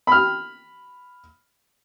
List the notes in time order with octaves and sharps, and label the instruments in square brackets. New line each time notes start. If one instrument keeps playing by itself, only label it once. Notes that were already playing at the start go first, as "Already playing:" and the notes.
[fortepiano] B5 F6